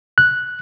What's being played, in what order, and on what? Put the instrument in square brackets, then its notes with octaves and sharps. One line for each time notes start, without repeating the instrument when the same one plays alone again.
[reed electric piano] F#6